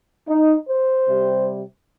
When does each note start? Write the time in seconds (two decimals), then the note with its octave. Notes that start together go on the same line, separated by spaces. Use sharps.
0.28 D#4
0.67 C5
1.06 C3 G3